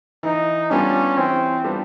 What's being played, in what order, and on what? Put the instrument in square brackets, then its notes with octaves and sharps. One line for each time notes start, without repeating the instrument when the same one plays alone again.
[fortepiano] E3 [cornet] D#4
[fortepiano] G3 B3 D4 F4 [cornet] C#4
[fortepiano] E3 [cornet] C4
[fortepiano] G3 B3 D4 F4